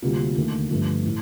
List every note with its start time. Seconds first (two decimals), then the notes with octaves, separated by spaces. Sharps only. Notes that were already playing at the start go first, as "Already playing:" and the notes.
0.02 D2 C3 G3 A#3 F4
0.36 D#2 D3 A3
0.70 G1 G2 F3 A3
1.06 A2